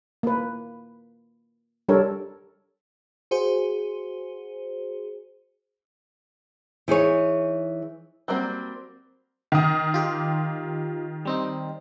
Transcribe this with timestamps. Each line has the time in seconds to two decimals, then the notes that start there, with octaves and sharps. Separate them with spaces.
0.23 A#3 B4
1.89 G3 D4 A4 A#4 C#5
3.31 F#4 G#4 C5
6.88 E3 D#4 G#4 C#5
8.28 F#3 G3 A#3 C4
9.52 D#3 D#6
9.94 F4 G4
11.25 G3 C4 D#4